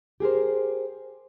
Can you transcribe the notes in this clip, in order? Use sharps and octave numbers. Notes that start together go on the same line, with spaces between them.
G4 G#4 A#4 C5